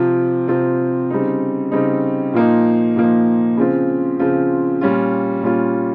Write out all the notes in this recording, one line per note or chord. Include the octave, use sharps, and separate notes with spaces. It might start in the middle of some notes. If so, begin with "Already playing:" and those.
Already playing: C3 F3 C4 F4
C3 F3 C4 F4
C#3 G3 C4 D#4
C#3 G3 C4 D#4
A#2 F3 A#3 D#4
A#2 F3 A#3 D#4
C#3 F3 C4 F4
C#3 F3 C4 F4
A#2 G3 C#4 F4
A#2 G3 C#4 F4